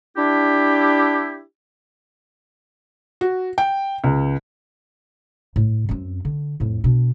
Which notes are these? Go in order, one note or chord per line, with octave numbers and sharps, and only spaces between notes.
D4 E4 G4
F#4
G5
C#2
A2
F#2 C4
D3
F2 A2
B2 D4